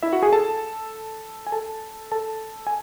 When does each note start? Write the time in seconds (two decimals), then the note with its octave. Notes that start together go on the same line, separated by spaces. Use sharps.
0.02 E4 E5
0.13 F#4 F#5
0.23 G#4 G#5
0.32 A4 A5
1.47 G#5
1.52 A4 A5
2.12 A4 A5
2.67 G#5